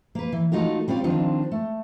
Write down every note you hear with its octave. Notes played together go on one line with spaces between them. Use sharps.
A#3 B4
E3
A3 D#4 F4 F#4 A#4
G3 C4 C#4 F4 D5
D#3 F3 C4 D4 D#4 F4
A3